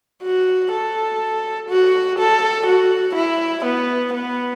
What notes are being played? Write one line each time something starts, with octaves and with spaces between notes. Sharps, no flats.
F#4
A4
F#4
A4
F#4
E4
B3
B3